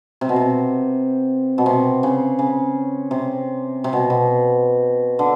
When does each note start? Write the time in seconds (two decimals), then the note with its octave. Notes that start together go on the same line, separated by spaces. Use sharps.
0.21 C3
0.29 B2
0.36 C3
1.58 B2
1.66 C3
2.03 C#3
2.39 C#3
3.11 C3
3.84 C3
3.93 B2
4.10 B2
5.19 D3